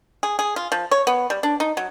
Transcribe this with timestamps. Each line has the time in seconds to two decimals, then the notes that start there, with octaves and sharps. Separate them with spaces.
0.23 G#4
0.39 G#4
0.56 F4
0.72 F3
0.91 C#5
1.07 B3
1.30 G3
1.43 D4
1.60 D#4
1.77 F#3